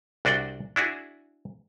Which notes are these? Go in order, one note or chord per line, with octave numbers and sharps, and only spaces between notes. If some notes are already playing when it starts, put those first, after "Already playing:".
C2 D4 F#4 D5 G5
D4 E4 F#4 G#4